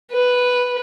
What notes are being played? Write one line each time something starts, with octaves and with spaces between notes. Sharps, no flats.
B4